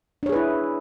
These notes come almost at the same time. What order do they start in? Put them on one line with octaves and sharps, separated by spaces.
D4 C#5 G#4 B4 E4